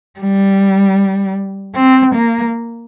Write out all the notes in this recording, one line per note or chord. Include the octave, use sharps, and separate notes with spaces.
G3
C4
A#3